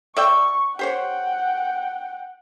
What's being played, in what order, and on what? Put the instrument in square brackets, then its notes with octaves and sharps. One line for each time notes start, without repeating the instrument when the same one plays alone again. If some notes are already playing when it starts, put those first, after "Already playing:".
[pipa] D5 E5 G5 [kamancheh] C#6
[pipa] G4 C5 C#5 [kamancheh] F#5 G5